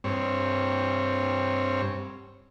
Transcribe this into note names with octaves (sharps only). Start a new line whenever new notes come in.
G2 C4 C#5